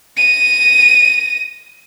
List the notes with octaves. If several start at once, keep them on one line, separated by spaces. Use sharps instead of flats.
A#6 D#7